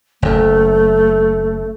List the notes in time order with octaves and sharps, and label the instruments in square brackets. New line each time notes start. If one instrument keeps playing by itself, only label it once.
[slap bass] F#1 F#2 [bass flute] A3